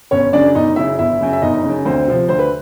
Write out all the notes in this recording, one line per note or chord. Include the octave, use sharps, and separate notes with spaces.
G1 C#4 C#5
F#2 C#3 D4 D5
G1 D#4 D#5
F#2 C#3 E4 E5
G1 E4 E5
F#2 C#3
E5
G1 D#4 D#5
C#3
F#2
D2 C4 C5
C3 F3
D2 C5
B4